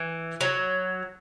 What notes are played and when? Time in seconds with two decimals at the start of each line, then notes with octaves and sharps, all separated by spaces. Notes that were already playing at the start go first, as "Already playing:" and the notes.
Already playing: E3
0.41 F#3